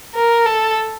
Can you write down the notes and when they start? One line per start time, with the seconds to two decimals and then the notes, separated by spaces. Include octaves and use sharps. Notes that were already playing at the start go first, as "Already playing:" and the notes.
0.15 A#4
0.45 A4